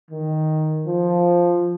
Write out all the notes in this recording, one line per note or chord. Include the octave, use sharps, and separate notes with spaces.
D#3
F3